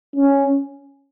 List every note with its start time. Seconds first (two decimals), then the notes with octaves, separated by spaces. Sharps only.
0.16 C#4